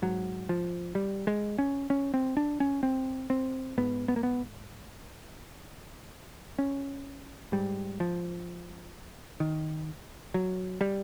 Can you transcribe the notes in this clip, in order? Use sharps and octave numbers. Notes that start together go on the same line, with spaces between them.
G#2 F#3
F3
G3
G#3
C#4
C#4
C4
D4
C#4
C4
C4
G#2 B3
B3
A#3
B3
C#4
G#2 G3
F3
D#3
F#3
G3